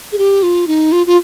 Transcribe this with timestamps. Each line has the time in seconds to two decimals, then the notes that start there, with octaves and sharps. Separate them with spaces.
0.12 G#4
0.18 G4
0.43 F4
0.67 D#4
0.92 F4
1.07 F4